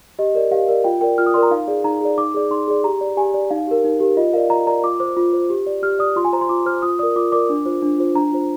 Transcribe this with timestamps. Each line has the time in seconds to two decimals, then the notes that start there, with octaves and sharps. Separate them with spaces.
0.19 G4 D#5
0.35 A#4 D5
0.51 G4 F5
0.68 A#4 D5
0.84 F4 G5
1.01 A#4 D5 G5
1.18 F4 F6
1.26 D#6
1.34 A#4 D5 C6
1.43 A#5
1.51 D#4 F5
1.68 G#4 D5
1.84 D#4 A#5
2.01 G#4 D5
2.18 D#4 D6
2.34 G#4 D5
2.50 D#4 C6
2.68 G#4 D5
2.84 G4 A#5
3.01 D5
3.17 G4 G#5
3.34 D5
3.50 D#4 F5
3.67 G4 A#4
3.84 D#4
4.00 G4 A#4
4.17 F4 D#5
4.33 A#4 D5 F5
4.50 F4 A#5
4.67 A#4 D5 A#5
4.83 F4 D6
5.00 C5 D6
5.17 F4
5.33 C5
5.50 G4
5.67 D5
5.83 G4 F6
5.99 D5 D#6
6.16 F4 C6
6.25 G#5
6.33 C5 A#5
6.41 C6
6.49 F4 D6
6.66 C5 F6
6.82 F4 D#6
6.99 A#4 D5 D#6
7.16 F4 D6
7.32 A#4 D5 D6
7.49 D4
7.66 F4 C5
7.82 D4
7.98 F4 C5
8.15 D4 A#5
8.32 F4 C5